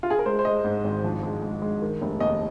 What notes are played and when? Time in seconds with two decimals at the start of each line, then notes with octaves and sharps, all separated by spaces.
0.03 F4
0.10 G#4
0.19 A#4
0.25 G#3 C5
0.39 C5
0.45 G#3 D#5
0.64 G#2
0.84 G#1
1.04 F3
1.23 G#3
1.42 G#3
1.62 G#3
1.82 D#3
2.01 F1
2.20 D#2 D#5